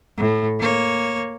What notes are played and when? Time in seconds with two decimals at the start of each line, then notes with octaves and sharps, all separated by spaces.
0.17 A2
0.59 A#3 C#5